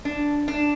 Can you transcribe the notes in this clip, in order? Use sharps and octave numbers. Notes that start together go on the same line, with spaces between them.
D4
D4